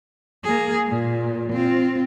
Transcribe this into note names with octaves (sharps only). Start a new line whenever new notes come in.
A#3 G#4
A#2
C4 F4